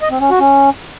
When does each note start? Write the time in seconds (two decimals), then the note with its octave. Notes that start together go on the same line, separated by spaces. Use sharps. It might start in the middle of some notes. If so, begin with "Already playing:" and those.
0.01 D#5
0.11 C4
0.21 C#4
0.31 F#4
0.41 C#4